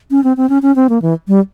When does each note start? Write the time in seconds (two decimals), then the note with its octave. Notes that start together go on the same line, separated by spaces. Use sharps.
0.11 C#4
0.24 C4
0.37 C4
0.49 C#4
0.62 C#4
0.76 C4
0.89 A#3
1.02 E3
1.28 G3